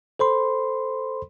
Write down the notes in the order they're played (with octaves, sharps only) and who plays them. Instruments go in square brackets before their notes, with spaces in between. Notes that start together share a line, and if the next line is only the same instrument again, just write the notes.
[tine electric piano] A4 C5 B5 C6